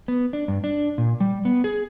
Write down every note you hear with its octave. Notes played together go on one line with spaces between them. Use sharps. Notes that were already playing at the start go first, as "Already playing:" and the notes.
B3
D4
G2
D4
A#2
G3
B3
G#4